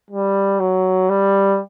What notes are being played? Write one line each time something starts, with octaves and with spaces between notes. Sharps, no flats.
G3
F#3
G3